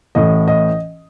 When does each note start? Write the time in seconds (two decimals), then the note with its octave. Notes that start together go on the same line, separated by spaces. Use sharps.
0.15 A1 A2 E3 D#5
0.48 D#5